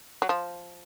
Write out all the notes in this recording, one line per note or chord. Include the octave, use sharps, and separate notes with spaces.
F#3
F3